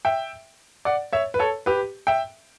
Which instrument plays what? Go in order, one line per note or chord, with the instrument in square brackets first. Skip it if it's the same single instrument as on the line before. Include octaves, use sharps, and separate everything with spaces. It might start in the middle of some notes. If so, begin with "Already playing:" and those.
[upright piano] E5 G5
D5 F#5
C#5 E5
B4
A4 C#5
G4 B4
E5 G5